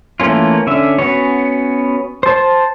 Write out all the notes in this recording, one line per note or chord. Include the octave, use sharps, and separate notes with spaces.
E3 A3 A#3 C#4 F4
D3 C#4 E5
B3 C#4 F#4 C#5
C5 A5